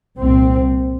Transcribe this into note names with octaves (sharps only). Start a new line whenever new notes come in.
C2 A#2 C4